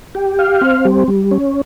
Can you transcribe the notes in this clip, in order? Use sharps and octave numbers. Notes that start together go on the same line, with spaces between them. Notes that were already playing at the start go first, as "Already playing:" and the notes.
G4
F5
C4
G3
G3
C#4